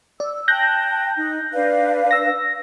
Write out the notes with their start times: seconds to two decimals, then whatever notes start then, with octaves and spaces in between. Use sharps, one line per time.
0.20 D5 E6
0.48 G5 A5 F#6 G6 A#6
1.16 D#4
1.53 D4 B4 F5
2.11 E6 A#6